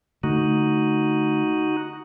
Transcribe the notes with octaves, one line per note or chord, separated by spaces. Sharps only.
D3 A3 D#4 F#4